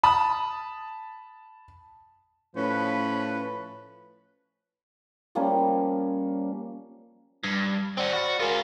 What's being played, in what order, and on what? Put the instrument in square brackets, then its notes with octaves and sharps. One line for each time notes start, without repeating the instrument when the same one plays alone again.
[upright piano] A5 B5 D#6
[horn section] A2 F3 C#4 B4
[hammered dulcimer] F3 G3 A#3 C#4
[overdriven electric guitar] G2 [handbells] G#6
[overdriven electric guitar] C4 F#4 [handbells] C5 D5 A#6
[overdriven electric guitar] F#4 [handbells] B5 F6 A6
[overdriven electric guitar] C#4 F4 [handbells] F#4 G#4 A#4